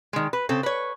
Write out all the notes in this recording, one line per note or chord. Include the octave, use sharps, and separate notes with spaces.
D#3 G#3
B4
C#3 C4 A4
B4 C#5